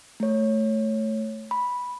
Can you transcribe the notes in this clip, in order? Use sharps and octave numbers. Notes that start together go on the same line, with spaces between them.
A3 C#5
B5